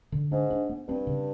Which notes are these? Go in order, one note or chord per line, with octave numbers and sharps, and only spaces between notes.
D3
G#2 D4
D4
B3
G2 C4
C#3